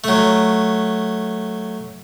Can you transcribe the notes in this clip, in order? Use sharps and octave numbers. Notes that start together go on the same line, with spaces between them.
F#3 A3